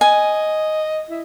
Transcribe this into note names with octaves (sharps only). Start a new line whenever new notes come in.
D#5 G#5
E4